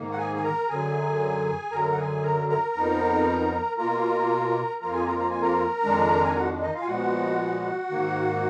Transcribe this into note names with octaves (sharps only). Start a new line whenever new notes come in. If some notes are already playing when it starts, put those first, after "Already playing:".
Already playing: G#2 D#3 A#3
F#5
G#4 G#5
G#5
A#4 A#5
F#2 D3 F#3 G#4 G#5
F#2 D3 F#3 A#4 A#5
F#5
G#4 G#5
A#4 A#5
A#4 A#5
F2 F3 B3 D#4
B2 A#3 F4 A#4 A#5
F2 F3 A#3 F4 A#4 A#5
G#4 G#5
A#4 A#5
A#5
G#5
A#4 A#5
F2 D#3 G#3 D4
G#5
F#4 F#5
D#4 D#5
F4 F5
G#5
A#2 F3 G#3 B3 F#4 F#5
G#2 D#3 A#3